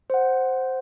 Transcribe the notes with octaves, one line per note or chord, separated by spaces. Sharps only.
C5 F#5